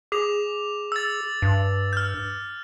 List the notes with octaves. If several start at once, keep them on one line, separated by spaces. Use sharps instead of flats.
G#4 D6 F7
E6 A6
G2
F6 G6